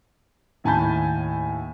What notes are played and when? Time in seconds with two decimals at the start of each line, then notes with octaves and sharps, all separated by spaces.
0.64 D#2 A2 G#5 A5 B5 G6